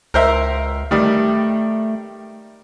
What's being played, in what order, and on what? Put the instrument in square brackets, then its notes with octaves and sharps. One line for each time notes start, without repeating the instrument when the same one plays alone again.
[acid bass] C#2 [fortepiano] A#4 C5 E5
[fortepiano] D#3 G3 [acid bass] A3